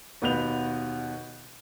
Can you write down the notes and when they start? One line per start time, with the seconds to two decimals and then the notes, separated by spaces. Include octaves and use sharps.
0.22 D#2 B2 B3 B4 G6 F7